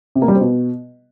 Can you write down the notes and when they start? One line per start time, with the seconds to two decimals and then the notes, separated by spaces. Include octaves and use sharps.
0.15 C3
0.22 A#3
0.28 G3
0.34 C4
0.41 B2